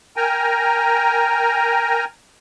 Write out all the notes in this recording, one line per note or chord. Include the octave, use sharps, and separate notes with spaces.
A#4 G5 G#5 A#5